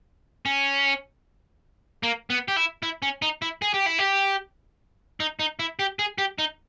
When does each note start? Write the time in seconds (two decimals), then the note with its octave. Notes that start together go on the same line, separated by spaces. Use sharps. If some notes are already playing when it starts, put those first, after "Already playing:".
0.46 C#4
2.03 A#3
2.30 B3
2.48 G4
2.56 E4
2.83 E4
3.02 C#4
3.22 D#4
3.42 E4
3.62 G#4
3.74 G4
3.86 E4
3.99 G4
5.20 D#4
5.39 D#4
5.59 E4
5.79 G4
5.99 G#4
6.18 G4
6.39 D#4